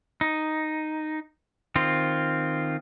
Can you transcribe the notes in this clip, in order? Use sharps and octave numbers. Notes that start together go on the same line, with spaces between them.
D#4
D#3 C4 F4